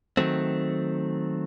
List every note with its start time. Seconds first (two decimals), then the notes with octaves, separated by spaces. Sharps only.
0.17 D#3 F#3 A3 C4